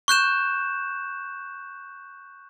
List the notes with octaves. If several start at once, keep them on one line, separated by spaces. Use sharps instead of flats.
C#6 F#6 G6 E7